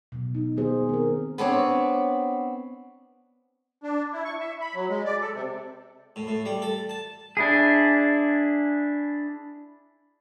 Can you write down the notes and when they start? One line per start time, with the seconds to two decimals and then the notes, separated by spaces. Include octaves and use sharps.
0.12 B2 F#3
0.35 D#4
0.57 D#3 B3 G#4 C5
0.89 C4 A#4
1.38 B3 C4 D4 C#5
3.83 D4
4.13 E4
4.25 C#6
4.40 E5
4.61 B5
4.75 F#3
4.89 G#3
5.05 D5
5.22 A4
5.34 C3
6.16 A2
6.27 A2
6.45 G3
6.62 A4
6.89 A5
7.37 D4 E4 G#4